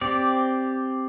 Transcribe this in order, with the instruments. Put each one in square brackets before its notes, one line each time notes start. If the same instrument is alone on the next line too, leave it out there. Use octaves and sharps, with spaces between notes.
[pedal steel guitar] C4 G4 D5